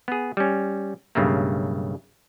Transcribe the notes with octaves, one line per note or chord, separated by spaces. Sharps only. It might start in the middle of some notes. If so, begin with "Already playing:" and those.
B3 G#4
G3 C#4
B1 G2 C#3 A3 A#3